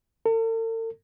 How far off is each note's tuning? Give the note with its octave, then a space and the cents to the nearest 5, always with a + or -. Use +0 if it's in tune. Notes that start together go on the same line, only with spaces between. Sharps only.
A4 +45